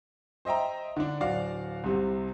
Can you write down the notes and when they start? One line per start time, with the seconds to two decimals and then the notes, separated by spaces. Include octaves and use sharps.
0.45 C5 D#5 E5 G5 A#5
0.96 D3 D4
1.20 D1 F#4 D5 F5
1.84 C2 C3